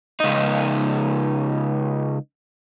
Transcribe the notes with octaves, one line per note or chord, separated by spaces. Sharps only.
C#2 D#4